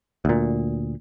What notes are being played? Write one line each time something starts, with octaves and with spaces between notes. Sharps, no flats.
D2 A#2